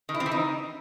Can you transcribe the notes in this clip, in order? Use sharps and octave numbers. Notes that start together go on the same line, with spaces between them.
D#3
E4
C4
E3
D#4